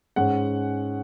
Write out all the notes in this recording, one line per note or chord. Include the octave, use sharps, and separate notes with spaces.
G#2 G#3 C#4 F#5